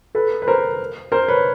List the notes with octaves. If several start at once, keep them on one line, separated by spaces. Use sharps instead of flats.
A4 B4
B4
A#4 C5
A#4 C5
B4 C#5